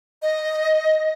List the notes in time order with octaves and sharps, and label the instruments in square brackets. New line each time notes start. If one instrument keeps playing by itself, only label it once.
[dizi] D#5